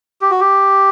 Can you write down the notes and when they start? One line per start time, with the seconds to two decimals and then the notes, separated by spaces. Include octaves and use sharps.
0.22 G4
0.31 F#4
0.40 G4